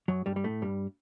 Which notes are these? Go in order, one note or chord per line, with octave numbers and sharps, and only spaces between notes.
F#2 F#3
G2 G3
G3
A2 A3
G2 G3